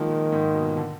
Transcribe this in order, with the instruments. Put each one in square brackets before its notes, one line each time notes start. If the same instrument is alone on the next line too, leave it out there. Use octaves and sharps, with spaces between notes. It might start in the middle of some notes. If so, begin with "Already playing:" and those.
Already playing: [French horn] D#3 [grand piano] F3 G#3 A#3
[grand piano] A#2
G#2
B2
D3